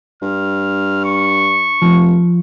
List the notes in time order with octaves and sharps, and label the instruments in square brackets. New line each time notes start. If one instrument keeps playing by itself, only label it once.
[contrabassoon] G2 [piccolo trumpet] F6
[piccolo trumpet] C#6
[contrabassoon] F1 [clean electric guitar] F3